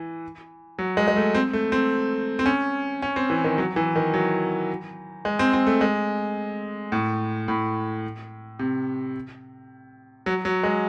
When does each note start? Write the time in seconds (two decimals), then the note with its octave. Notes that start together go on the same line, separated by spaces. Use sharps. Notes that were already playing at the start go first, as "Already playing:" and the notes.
Already playing: E3
0.79 F#3
0.97 G#3
1.08 G#3
1.16 A3
1.35 C4
1.53 A3
1.72 C4
2.39 C4
2.46 C#4
3.02 C#4
3.16 C4
3.30 E3
3.44 D#3
3.58 F#3
3.76 E3
3.96 D#3
4.14 F#3
5.25 G#3
5.39 C4
5.53 C4
5.67 A3
5.81 G#3
6.92 A2
7.48 A2
8.59 C3
10.26 F#3
10.45 F#3
10.63 G#3